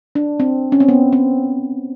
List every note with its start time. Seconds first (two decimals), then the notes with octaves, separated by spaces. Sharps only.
0.15 D4
0.40 C4
0.72 C#4
0.80 C4
0.88 B3
1.13 C4